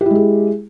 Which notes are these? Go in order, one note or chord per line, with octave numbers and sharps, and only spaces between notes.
G#3 E4 G4 G#4